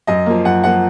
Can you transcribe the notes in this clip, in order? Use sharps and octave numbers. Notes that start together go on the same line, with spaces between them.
F#2 D#5
F3 A#3
F#2 F#5
F3 A#3 F#5